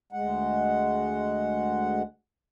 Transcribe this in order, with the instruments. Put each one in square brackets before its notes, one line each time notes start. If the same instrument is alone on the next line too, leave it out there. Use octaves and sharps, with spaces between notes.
[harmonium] D2 G#3 F#5